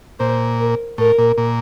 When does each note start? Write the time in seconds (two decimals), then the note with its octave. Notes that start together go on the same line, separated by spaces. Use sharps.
0.20 A#2 C5
0.60 A#4
0.98 A2 A#4
1.18 A#2
1.38 A#2